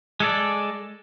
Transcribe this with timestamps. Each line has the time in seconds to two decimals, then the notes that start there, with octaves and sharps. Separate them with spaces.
0.20 G#3 A4 D5